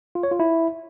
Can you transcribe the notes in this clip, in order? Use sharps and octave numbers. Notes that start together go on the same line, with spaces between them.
F4
C#5
F4
E4